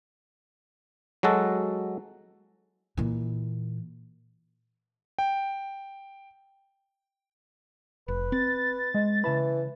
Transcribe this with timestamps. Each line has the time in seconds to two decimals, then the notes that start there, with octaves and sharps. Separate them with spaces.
1.23 F#3 G#3 F#4 A4
2.97 A#2 E3
5.19 G5
8.08 F1 B4
8.32 C4 A6
8.94 G#3
9.24 C#3 E3 A5 B5